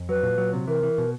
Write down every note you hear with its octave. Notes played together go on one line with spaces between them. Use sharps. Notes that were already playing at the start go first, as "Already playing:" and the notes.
Already playing: F2
F#3 B4
A#2
F#3
C3
E3 A#4
E3
B2